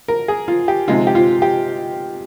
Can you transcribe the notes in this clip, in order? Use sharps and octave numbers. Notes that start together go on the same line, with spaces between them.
A#4
G#4
F4
G4
C3 F3 G#3 D#4 F4
G4
F4
G4